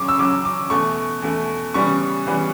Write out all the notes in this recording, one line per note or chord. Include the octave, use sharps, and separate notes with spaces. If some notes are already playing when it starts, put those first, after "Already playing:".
Already playing: C#3 F#3 C#4 C#6 D6
E6
C#3 F#3 C#4 D6
D6
E2 B2 A3 C#6
E2 B2 A3
C#3 E3 G3 B3 C#6
C#3 E3 G3 B3